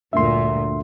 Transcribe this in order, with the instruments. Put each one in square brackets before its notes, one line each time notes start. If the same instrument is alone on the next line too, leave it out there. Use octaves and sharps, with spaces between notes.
[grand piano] D2 G2 [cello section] A#2 [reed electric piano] E5 C6